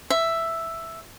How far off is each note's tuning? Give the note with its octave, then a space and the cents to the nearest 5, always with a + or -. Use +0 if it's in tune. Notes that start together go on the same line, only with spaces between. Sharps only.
E5 +5